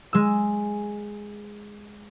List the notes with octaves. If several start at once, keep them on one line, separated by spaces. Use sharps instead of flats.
G#3 E6